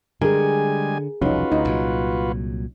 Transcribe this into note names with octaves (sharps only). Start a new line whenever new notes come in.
D3 G3 G#3 G#4 A#4 G#5
E1 C2 F3 C#4 D#4 F4 F#4 B4
D2 D#4
C2 A#2 F#3